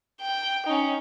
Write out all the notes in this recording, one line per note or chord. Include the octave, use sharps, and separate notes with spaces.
G5
C#4 D#4